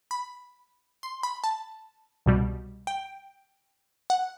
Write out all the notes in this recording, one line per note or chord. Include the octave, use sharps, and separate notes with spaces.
B5
C6
B5
A5
C2 B2 G3
G5
F#5